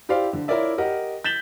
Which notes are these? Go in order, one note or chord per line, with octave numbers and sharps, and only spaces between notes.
E4 G4 C5 D5 F5
D3
E4 F4 A#4 C#5 D5 E5
G4 A#4 D#5 F#5
G6 A6 B6 E7 F#7 G7